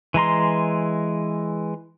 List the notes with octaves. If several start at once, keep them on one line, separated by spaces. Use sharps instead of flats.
E3 G#3 A#5 C6